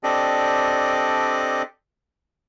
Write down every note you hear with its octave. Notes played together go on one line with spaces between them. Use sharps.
C4 D4 G4 A4 D5 D#5